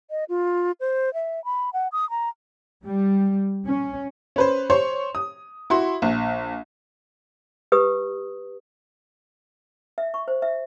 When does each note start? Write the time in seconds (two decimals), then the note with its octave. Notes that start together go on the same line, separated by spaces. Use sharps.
0.10 D#5
0.29 F4
0.80 C5
1.14 E5
1.45 B5
1.73 F#5
1.92 D#6
2.10 A#5
2.85 G3
3.66 C#4
4.36 C#4 B4 C5
4.70 C5 C#5 C6
5.15 D#6
5.70 E4 F#4 C6
6.02 A#1
7.72 G4 B4 D#6
9.98 E5
10.14 C#6
10.28 C5
10.42 E5